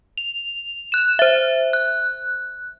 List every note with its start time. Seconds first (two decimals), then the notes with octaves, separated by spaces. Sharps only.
0.18 F7
0.92 F#6 E7
1.19 C5 E5
1.73 F#6